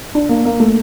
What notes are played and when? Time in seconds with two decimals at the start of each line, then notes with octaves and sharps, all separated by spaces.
0.15 D4
0.29 A#3
0.45 A#3
0.60 A3